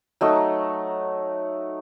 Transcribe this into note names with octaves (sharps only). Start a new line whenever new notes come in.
F#3 A3 D#4